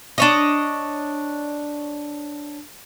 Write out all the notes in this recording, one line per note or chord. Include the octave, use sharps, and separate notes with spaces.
D4 C#5 D#5